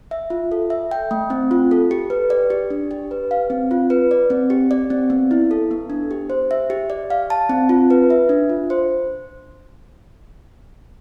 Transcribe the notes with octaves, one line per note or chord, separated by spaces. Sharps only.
E5
F4
A4
E5
G5
A3
C4
F4
A4
G4
B4
D5
G4
D4
G4
B4
F5
C4
F4
B4
D5
C4
G4
D5
C4
B3
E4
A4
B3
D4
G4
C5
E5
G4
D5
F5
A5
C4
F4
B4
E5
D4
F4
C5